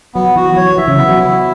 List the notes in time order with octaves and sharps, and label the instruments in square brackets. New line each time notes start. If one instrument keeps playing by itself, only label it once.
[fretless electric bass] F#3 [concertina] B3
[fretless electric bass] E3 [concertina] F#4
[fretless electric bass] F#3 [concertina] C#5
[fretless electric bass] E3 [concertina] E5
[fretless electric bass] C#3
[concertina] B3
[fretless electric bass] F#3
[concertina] E4